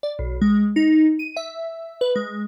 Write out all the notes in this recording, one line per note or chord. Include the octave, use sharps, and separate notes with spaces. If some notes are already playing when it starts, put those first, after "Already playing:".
D5
B1
G#3
D#4
D#7
E5
B4
G#3